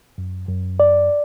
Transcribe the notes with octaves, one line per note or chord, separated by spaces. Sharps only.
F#2
F#2
D5